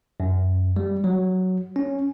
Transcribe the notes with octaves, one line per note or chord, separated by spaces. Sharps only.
F#2
G3
F#3
C#4